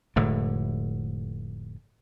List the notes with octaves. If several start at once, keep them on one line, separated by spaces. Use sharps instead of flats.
F1 A2 D3 G#3